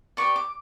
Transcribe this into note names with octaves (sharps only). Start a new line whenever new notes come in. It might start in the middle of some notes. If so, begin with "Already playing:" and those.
G4 B4 D5 C#6
D6